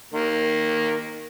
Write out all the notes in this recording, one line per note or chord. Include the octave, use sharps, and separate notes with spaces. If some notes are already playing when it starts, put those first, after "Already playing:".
D#3 A#3